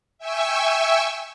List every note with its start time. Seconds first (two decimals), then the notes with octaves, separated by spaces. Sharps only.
0.18 E5 G5 G#5 C#6 E6